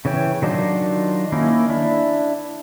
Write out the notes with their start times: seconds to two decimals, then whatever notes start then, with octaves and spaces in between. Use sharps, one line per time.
0.05 C#3 E3 C#5 G5
0.42 D#3 F#3 D4 D#4 F4
1.32 D#3 A#3 C#4 D#4 E4
1.69 D4 E4